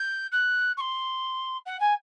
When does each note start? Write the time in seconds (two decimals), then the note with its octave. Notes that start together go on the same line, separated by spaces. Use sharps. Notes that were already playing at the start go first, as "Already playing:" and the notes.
Already playing: G6
0.32 F#6
0.77 C#6
0.80 C6
1.66 F#5
1.80 G#5